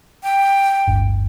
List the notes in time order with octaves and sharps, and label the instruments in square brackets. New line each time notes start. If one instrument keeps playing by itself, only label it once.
[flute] G5
[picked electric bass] D1 G1